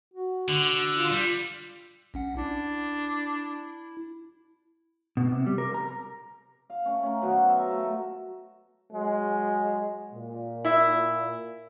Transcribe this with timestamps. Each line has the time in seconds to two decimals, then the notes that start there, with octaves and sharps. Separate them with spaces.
0.14 F#4
0.48 D3
0.95 F4
1.12 G3
2.14 B1 C#4 F#5
2.37 D4 E4
5.17 B2
5.32 C3
5.46 G3
5.58 A#4
5.74 A#5
6.70 F5
6.86 A3 C#4
7.03 C#4 A#4
7.21 B2 D#3 F#3 C5
7.49 E5 A#5
7.71 A3
8.92 F#3 G#3
10.12 A#2
10.65 E4 E5